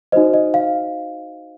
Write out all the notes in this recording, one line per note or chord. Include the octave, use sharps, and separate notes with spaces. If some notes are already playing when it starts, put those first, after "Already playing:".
D#4 F#4 C5 D#5
D#5
F5